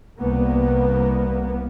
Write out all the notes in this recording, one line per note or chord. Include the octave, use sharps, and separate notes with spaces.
C2 A#3 B3